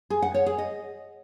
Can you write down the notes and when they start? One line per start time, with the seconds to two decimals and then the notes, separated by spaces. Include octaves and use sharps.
0.10 G#4
0.22 F#5
0.34 C#5
0.46 G#4
0.58 D#5